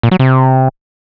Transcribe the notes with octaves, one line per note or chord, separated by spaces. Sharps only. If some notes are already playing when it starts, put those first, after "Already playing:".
A#2
F#3
C3